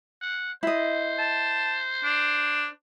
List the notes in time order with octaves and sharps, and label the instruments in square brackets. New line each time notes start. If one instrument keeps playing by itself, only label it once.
[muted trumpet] F#5
[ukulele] E4 D#5 [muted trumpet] C5
[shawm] A5
D4